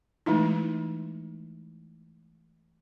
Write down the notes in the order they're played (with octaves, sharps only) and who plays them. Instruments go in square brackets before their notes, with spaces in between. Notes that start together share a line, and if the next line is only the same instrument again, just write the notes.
[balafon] E3 G#3 A3 D#4 E4